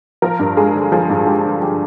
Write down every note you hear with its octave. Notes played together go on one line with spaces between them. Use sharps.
F3 A#4
G2
G#3 G#4
D3
F3 G#4
G2
G#3 G4
D3
F3 G4